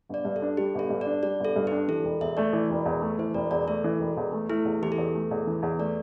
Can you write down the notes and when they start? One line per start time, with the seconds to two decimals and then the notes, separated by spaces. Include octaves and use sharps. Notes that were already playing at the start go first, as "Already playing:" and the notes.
0.09 G1 D5
0.25 G2
0.36 A4
0.42 D4
0.57 G3 G4
0.75 G1 A4
0.90 G2
1.01 D5
1.06 D4
1.23 G3 D5
1.40 G1 A4
1.56 G2
1.67 D4 G4
1.88 E3 A4
2.04 E1
2.21 E2 E5
2.37 A3 D5
2.53 E3
2.70 E1
2.85 E2
3.02 A3
3.18 E3 C5
3.34 E1 D5
3.51 E2 D5
3.67 A3 A4
3.84 E3
4.00 E1
4.17 E2
4.33 A3
4.49 A3 E4
4.65 E2
4.82 E3 G4
4.92 A4
4.98 E2
5.14 A3
5.31 E2
5.47 E3
5.62 E2
5.79 A3 D5